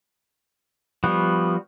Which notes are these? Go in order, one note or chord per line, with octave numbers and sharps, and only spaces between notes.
F3 G3 B3 F#4